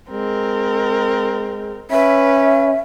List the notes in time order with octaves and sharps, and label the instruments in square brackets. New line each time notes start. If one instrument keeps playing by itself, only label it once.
[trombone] G#3 [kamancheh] C4 A#4
[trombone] C#4 [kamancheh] B4 [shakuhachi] E5